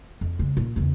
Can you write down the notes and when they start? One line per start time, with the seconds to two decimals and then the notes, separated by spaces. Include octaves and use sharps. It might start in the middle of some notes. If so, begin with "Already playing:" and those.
0.21 F2
0.39 C#3 G#3
0.57 A#2
0.76 E2 C#3